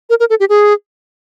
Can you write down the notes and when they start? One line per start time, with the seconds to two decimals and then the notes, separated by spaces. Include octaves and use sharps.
0.10 A#4
0.20 A#4
0.30 A4
0.40 G4
0.49 G#4